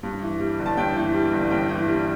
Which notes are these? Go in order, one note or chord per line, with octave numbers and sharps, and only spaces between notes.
G2
E3
G3
G1
A5
G2 G5
E3
G3
G1
G2 G5
E3
G3